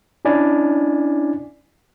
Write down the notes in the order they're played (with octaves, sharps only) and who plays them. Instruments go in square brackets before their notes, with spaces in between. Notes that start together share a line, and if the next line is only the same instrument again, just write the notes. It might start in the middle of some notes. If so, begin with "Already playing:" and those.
[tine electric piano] C#4 D4 E4 D5 G#5